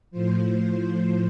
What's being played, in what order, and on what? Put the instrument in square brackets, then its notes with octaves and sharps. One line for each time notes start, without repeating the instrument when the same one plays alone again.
[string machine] A2 F3 C5